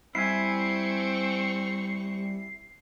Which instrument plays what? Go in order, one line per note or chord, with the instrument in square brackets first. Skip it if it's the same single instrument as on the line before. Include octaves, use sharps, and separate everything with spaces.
[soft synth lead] G3 [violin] C4 C#6 [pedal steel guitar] E4 E5 G#5 [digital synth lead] C7